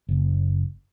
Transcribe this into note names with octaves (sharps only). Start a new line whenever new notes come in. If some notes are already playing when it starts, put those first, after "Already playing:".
F#1